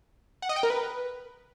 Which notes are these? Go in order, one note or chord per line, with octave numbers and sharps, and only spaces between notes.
F#5
D#5
G5
A#4
B4